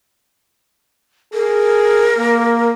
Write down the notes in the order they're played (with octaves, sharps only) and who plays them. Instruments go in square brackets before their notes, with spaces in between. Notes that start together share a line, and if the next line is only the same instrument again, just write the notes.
[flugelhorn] G#4 [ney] A#4
[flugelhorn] A#3